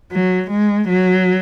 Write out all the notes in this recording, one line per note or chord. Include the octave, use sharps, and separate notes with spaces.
F#3
G#3
F#3